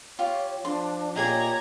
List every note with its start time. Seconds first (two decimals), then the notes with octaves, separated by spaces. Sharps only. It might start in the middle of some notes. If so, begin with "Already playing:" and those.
0.19 F4 G4 C#5
0.65 F3 D4 C6
1.16 A#2 G4 G#4 C#5 D#5 A#5 G#6